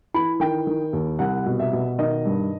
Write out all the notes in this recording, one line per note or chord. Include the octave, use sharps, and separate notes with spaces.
E3 B5
D#3 G5
D#3
D#2
C2 F#5
B2
E5
B2
D#3 D#5
G2